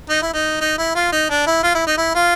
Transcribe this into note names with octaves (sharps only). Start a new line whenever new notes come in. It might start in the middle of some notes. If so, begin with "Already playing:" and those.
D#4
E4
D#4
D#4
E4
F4
D#4
D4
E4
F4
E4
D#4
E4
F4